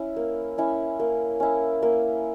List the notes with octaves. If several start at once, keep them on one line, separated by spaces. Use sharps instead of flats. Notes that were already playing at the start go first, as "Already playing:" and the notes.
Already playing: C#4 E4
A#3
C#4 E4
A#3
C#4 E4
A#3